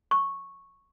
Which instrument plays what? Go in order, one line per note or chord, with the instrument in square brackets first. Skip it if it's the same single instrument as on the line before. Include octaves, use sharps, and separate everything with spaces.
[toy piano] C#6